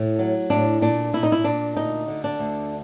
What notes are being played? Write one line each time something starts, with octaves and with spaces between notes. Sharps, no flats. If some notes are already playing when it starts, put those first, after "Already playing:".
Already playing: A2
F#3
A2 D4
A#2 D4
A#2 E4
D#4
E4
A#2 D4
D2 D#4
D3
D4
D2